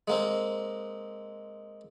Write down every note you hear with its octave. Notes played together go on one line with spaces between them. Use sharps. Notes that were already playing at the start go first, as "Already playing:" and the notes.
G#3 A#3 C4